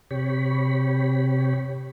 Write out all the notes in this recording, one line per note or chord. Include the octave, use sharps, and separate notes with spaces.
C3 G4 C#5 B5